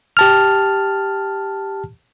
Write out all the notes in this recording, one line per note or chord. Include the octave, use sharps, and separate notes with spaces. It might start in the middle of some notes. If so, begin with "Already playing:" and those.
G4 A5 F6